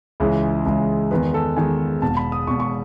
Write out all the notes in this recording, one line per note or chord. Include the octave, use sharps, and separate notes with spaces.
C#2 C#3 E3 G#3
C#2 C#3 E3 G#3
E2 D#3 G#3 B4
A4
E2 D#3 G#3 G#5
E1 E2 B2 A5
B5
D#6
E1 E2 B2 C#6
C#6